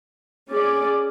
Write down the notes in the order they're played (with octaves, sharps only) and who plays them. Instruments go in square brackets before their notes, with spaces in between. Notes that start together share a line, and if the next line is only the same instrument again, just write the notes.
[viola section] C#4 G#4 D5